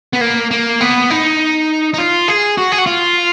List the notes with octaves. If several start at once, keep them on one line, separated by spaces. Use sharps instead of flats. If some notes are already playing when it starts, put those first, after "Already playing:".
B3
A#3
A#3
B3
D#4
D#4
F4
G#4
F#4
G#4
F#4
F4